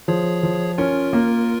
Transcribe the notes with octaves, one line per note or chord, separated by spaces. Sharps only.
F3 G#4 C#5
F3
C#4 F4 A#4
A#3